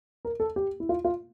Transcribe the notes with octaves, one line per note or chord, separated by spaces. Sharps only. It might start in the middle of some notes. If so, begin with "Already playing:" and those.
A#4
A4
G4
E4
F4
F4